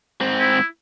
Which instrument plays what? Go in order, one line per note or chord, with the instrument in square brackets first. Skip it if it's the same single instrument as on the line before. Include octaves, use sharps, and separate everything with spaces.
[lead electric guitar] G#2 C4
[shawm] E4